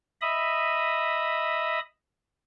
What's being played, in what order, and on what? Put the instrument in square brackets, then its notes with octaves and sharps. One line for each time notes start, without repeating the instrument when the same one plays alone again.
[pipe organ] D#5 E5 B5 D#6